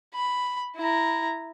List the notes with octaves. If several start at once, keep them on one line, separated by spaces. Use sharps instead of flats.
B5
E4 A#5